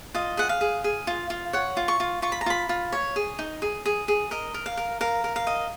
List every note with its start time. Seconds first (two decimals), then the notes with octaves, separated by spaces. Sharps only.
0.14 F4 D#5
0.37 G#4 F#5
0.49 F5
0.61 G#4
0.84 G#4
1.07 F4
1.30 F4
1.53 C#5 F#5
1.77 F4
1.88 C#6
2.00 F4
2.22 F4 C#6
2.32 B5
2.41 A#5
2.46 F4 B5
2.69 F4
2.92 C#5
3.16 G#4
3.39 D#4
3.62 G#4
3.85 G#4
4.08 G#4
4.31 A#4 D#5
4.54 A#4
4.66 F5
4.77 A#4
5.01 A#4 F5
5.24 A#4
5.36 F5
5.47 D#5